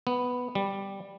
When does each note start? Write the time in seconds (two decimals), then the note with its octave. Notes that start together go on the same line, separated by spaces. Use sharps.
0.07 B3
0.55 G3